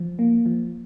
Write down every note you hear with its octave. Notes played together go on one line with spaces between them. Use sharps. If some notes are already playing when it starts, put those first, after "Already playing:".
Already playing: F3
A#3
F3